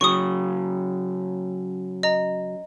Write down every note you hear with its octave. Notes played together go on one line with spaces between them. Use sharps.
C#3 F#3 C#6 D#6
D#5 A#5